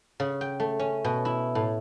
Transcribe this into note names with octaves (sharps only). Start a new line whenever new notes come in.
C#3
G5
A3
C#4
B2
E4
A2